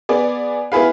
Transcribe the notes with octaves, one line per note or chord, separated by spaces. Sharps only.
B3 G#4 D5
B3 E4 G#4 B4 F5